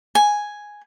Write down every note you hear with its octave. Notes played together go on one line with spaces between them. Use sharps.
G#5